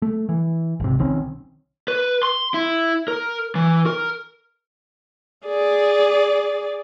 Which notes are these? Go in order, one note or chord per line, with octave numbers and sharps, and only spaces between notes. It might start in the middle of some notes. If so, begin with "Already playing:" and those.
A3
E3
G#1 C3
B1 D#3 C4 C#4
B4
C6
E4
A#4
E3
A#4
G#4 D5